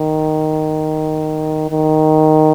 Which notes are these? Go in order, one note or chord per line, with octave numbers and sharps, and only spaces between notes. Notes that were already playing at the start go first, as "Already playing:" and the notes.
Already playing: D#3
D#3